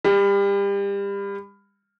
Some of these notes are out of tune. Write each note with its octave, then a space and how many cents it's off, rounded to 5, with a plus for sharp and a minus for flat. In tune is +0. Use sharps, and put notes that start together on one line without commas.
G3 +30